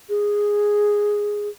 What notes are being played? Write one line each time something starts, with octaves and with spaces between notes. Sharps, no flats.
G#4